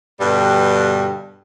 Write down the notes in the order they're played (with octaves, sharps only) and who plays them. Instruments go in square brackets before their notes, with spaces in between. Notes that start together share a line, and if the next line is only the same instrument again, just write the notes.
[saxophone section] G2 B2 D3 G3